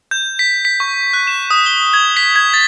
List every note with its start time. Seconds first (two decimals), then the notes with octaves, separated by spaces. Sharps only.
0.11 G6
0.39 B6
0.65 B6
0.80 C#6
1.13 F#6
1.27 E7
1.51 D#6
1.66 G7
1.93 G#6
2.17 B6
2.36 G#6
2.54 A6